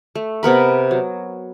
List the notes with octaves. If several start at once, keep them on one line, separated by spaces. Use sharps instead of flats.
A3
C3 B3 A#4 B5
F#3